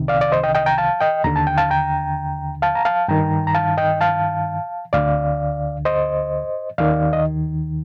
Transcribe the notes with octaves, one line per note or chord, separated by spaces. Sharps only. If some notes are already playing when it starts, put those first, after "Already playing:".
Already playing: C2 C3 D#3
D5 F5
D5
C5 D#5
D#5 G5
D#5 G5
G5 A#5
F5 A5
D#5 G5
D#2 D3 A#5
A5
G5
F5 A5
G5 A#5
F5 A5
A#5
F5 A5
G2 D#3 G5 A#5
A#5
F5 A5
D#5 G5
F5 A5
D2 D3 D5 F5
C5 D#5
D#2 D#3 D5 F5
D#5